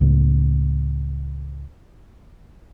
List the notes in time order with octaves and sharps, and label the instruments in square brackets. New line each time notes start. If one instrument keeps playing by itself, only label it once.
[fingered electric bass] C#2 A2